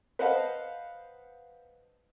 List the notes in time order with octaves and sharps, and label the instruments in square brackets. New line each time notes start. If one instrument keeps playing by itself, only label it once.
[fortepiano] B4 C5 D#5 F5 F#5 A5